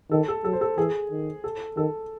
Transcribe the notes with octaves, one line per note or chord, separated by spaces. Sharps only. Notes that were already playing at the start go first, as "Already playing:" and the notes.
D#3 A4
A4
F#3 A4
C5
A4
E3 G#4
D#3
A4
D#3 A4